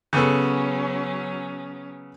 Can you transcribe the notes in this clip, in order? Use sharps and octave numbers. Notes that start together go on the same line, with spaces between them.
C#3 F#3 B3 C#4 A4